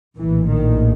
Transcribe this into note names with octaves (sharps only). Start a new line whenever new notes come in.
A#1 A2 E3
D#3